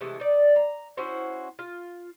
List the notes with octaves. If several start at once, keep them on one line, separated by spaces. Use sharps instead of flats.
C3 E3 G#3 A3
D#4 D5
A#5
C#4 E4 F#4 C5
F4